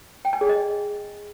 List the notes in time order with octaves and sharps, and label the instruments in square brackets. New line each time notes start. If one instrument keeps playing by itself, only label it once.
[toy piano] G5
G#5
G#4
D#5